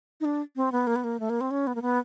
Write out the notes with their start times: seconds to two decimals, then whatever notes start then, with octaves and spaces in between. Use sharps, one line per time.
0.21 D#4
0.25 D4
0.56 C4
0.72 B3
0.87 A#3
0.96 B3
1.04 A#3
1.20 A3
1.30 A#3
1.41 C4
1.51 C#4
1.67 B3
1.75 A#3
1.82 B3